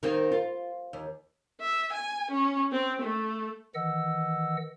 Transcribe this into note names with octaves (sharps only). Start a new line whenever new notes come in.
D#3 A#3 C4
F4
D#2
E5
G#5
C#4
C4
A3
D#3 E3 D#5 F#5 E6